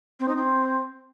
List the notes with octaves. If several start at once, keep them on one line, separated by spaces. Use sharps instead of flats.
C4
D#4
C4